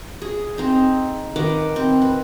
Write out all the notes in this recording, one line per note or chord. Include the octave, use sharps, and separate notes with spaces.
G#4
C4 D#4
D#3 B4 F#5 D6
C4
B4